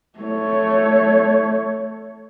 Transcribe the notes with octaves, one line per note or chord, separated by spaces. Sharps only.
A3 C#5